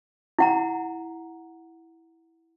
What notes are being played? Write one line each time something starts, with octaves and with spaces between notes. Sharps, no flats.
E4 F#5 A#5